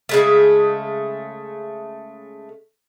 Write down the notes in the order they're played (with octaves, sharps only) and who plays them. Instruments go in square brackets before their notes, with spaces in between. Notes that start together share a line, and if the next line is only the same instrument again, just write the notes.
[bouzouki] C#3 G#3 A3